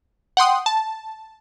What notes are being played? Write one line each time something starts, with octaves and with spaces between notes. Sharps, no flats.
F#5 G5 C6 D#6
A5